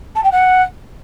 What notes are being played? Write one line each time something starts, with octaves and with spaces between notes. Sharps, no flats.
A5
G5
F#5